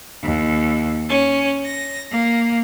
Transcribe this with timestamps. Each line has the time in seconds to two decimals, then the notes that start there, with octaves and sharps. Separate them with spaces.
0.23 D#2
1.08 C#4
1.64 A#6
2.12 A#3